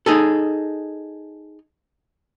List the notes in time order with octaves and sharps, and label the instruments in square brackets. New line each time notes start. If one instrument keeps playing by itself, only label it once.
[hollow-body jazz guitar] D#4 G#4 A4